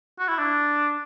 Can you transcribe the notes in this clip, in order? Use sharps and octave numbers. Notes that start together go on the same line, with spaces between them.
F#4
E4
D4